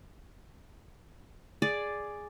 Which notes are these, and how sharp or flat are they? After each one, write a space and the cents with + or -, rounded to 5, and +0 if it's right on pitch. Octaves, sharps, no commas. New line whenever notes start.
G#4 +0 D5 +0